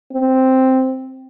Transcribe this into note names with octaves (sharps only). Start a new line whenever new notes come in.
C4